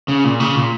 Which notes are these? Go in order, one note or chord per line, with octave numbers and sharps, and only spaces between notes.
C#3
A#2
C#3
A#2